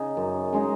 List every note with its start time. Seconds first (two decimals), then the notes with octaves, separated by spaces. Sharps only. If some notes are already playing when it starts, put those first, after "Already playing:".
Already playing: C#3 D#4
0.17 F#2
0.53 C#3 G#3 D#4